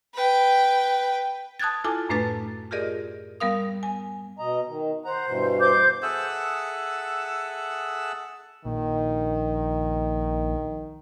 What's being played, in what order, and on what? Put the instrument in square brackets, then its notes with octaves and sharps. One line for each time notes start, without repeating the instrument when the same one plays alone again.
[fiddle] B4 G5
[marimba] A5 D#6 F#6 G#6 A6
E4 F4 A4 G#5 A5 D6
F#2 A2 A3 D4 B4 A6
F4 G4 G#4 A#4 D5 D#5
G3 B3 A#4 F5 D#6
G#5
[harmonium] B2 D#5 A#5
D#3
[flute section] C5 [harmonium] F#5 A#5
[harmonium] G2 B2 E3
[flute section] C5 D6 G6
[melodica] G#4 A4 E5 F#5
[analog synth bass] A#1 [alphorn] D#3